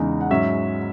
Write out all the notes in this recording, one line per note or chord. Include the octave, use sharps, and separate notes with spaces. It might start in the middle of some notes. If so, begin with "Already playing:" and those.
Already playing: E2 C#3 G#3 D#4
F#5
G#2 F#3 C#4 E5